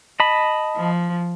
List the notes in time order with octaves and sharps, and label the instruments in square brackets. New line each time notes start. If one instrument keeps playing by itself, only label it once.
[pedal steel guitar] D#5 A5 B5
[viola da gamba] F3